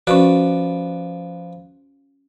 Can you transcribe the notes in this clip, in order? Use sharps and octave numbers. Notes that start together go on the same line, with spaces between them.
F3 C#4 F#4 B4 D5